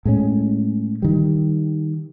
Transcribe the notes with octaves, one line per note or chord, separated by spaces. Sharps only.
A2 G#3 C#4
D#3 G3